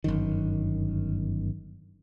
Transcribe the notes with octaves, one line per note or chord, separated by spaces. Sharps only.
G1 F#2 D#3